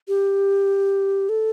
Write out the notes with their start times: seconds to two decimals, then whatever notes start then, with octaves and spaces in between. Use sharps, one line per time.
0.08 G4
1.29 A4